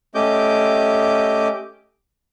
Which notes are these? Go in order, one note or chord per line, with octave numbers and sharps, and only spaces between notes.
A3 C#4 G4 D#5 D6 G6